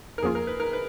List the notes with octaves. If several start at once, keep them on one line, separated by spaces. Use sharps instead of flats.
A#4
F2 F3 A#3 C#4 F4 G#4
A#4
B4
A#4
B4